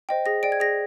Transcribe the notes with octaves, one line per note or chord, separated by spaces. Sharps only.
C5 D#5 G5
G#4 A#6
D5 G5 D7
G#6
G#4 A#6